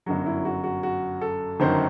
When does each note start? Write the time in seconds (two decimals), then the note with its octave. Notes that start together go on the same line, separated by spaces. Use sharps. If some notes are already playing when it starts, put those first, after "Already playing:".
0.06 G1 F#2 F#3 F#4
0.26 E4
0.45 F#4
0.64 F#4
0.83 F#4
1.21 A4
1.60 G1 F#2 D#3 F#3 C5